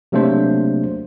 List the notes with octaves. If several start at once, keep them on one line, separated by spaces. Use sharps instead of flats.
C3 F#3 A3 A#3 D4 C5